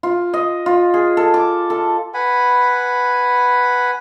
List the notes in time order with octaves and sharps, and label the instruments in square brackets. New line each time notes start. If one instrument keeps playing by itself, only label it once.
[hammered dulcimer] F4
D#5
F4
G#4
A4
D6
A4
[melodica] B4 F#5 G#5 B5